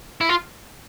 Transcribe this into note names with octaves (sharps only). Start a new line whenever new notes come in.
E4
F4